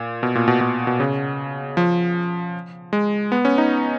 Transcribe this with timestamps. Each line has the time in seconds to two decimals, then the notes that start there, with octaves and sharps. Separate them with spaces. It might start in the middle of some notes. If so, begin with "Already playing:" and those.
Already playing: A#2
0.23 B2
0.35 A#2
0.48 B2
0.61 B2
0.87 B2
1.00 C#3
1.77 F3
2.93 G#3
3.32 B3
3.45 C#4
3.58 D#4